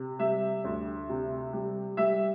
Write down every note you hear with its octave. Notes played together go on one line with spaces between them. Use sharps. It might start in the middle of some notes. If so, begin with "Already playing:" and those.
Already playing: C3
G3 E5
D2
C3
G3
G3 E5